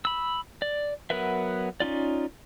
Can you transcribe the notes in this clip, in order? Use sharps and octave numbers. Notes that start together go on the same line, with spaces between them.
B5 E6
D5
F#3 B3 A#4 B4 E5
C#4 D#4 F4 D5